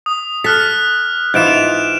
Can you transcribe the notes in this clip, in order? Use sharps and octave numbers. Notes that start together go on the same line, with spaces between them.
D#6
A4 F6 F#6 B6
G#2 E3 F4 G6 D7 E7
F7